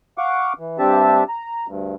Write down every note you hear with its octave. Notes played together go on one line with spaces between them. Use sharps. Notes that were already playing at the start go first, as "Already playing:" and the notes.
F5 F#5 C#6 D6
E3
G2 C4 D4 G4 E5 A5
A#5
D2 G2